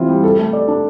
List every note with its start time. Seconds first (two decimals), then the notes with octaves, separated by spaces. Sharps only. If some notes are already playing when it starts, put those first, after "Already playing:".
Already playing: E3 C4 F4
0.09 G3
0.23 A4
0.39 A3
0.53 D5
0.68 D4